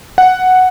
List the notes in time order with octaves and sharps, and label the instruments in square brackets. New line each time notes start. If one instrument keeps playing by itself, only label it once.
[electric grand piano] F#5